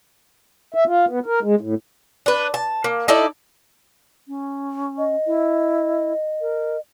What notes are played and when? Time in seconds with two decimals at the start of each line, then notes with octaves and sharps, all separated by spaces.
0.74 E5
0.87 F4
1.09 B3
1.26 A#4
1.43 G#3
1.61 A2
2.26 D4 B4
2.54 A5
2.84 A#3
3.08 D#4 E4 A4 D5
4.28 C#4
4.98 D#5
5.27 E4
6.41 A#4